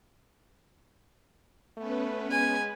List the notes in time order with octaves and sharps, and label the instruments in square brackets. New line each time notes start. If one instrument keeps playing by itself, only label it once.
[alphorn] A3 [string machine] B3 C#4 B4
[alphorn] G#3 [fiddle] G#5